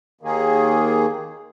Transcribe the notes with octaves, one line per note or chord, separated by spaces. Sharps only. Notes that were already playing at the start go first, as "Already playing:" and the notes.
D#2 D#3 A#3 G#4